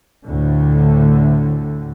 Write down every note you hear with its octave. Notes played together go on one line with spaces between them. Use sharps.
D2 A2 D3